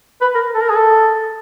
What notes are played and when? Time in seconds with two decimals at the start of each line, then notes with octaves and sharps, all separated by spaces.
0.21 B4
0.35 A#4
0.55 A4
0.62 A#4
0.70 G#4
0.76 A4